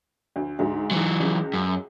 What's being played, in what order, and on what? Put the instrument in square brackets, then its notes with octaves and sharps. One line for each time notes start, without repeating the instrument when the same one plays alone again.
[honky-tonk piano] D2
D2 G#2
[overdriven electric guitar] E3 F#3
[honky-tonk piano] C#2
[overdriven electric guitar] F#2